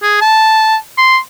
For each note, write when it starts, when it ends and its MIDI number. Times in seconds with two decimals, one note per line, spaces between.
0.03 0.21 68
0.21 0.77 81
0.98 1.18 84